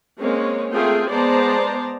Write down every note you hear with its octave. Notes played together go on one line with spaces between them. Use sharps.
G#3 A#3 C4 C#4 C#5
A3 C4 F4 G#4 A#4 G5
G#3 B3 C5 D5 A5 A#5